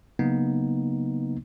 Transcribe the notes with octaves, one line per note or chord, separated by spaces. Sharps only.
C#3 F#3 A#3 B3 D#4